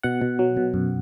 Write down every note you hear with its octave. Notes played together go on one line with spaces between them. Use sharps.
B2 F#5
B2
F#3
B2
F#2